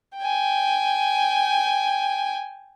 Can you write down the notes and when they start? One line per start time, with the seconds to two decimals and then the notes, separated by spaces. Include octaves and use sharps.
0.18 G5 G#5